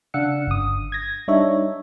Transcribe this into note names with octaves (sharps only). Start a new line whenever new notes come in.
C#3 D4 F5 F#5 E6 C#7
G1 D#6
G#6 A#6
G3 D4 D#4 C#5 E5